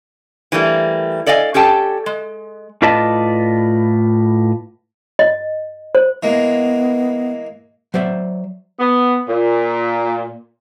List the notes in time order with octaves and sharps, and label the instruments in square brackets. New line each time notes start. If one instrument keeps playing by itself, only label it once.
[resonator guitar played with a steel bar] E3 G3 A3 A#3
A4 D5 D#5 F5 G5 G#5
C#4 G4 A4 G5 A5
G#3
[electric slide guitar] A2 F4 B4 D5 D#5 A5
[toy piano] D#5
C5
[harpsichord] E3 G#3 A#3 [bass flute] B3
[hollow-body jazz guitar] F#3 C5 D5 E5
[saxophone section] B3
A#2